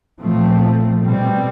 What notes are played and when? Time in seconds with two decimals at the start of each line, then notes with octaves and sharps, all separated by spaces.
0.21 A#2 F3 A3 C4
1.01 B2 G3 C4